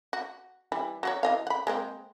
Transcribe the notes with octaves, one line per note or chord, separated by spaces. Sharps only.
F#4
E3 G3 E4
F#3 F#4 C#5
E3 D#5 F5
F#5 B5
G#3 A#3 C4